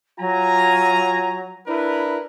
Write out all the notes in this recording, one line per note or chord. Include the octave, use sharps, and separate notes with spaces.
F#3 F4 G#5 A#5
D4 E4 A#4 B4